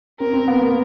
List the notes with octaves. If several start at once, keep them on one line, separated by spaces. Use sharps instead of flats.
C4 A#4
C4
B3
A#3